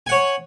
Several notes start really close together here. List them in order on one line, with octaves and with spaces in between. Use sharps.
G#5 F#5 C#5